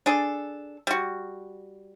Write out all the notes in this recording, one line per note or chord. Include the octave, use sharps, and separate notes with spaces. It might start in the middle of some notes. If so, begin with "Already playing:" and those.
D4 G#4 A4
G3 F#4